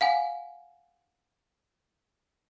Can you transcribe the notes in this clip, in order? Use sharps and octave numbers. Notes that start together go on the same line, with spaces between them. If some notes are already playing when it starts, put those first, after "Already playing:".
F5 F#5 G#5